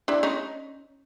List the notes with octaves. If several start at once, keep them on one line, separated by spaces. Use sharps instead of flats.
D4 E4
C#4 D#4